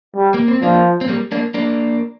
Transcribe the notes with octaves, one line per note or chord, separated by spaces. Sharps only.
G3
A#3
C4
F3 A#3 D4
C4
G3 A#3
A#3 D4
A#3 D4